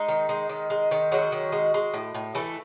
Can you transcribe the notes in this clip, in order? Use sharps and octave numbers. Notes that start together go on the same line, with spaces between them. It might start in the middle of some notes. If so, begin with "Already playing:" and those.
Already playing: G#3 D#4
D#3
G#3
D#3
G#3
D#3
F#3 G#3 F#4
D#3
G#3
G#3
A2
A2
E3 A3 A4